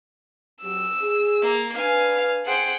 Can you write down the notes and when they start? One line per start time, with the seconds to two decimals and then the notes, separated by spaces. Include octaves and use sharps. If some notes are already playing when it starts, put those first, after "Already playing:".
0.63 F#3 G4 E6
1.01 G#4
1.41 A#3
1.77 D4 B4 F5 G#5
2.46 G#4 C5 F#5 G5